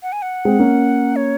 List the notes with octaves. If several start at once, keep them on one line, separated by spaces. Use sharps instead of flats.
F#5
G#5
F#5
G#3 C4
A#3 C#4
C#5